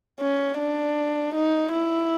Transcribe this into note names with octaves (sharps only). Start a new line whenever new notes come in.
C#4
D4
D#4
E4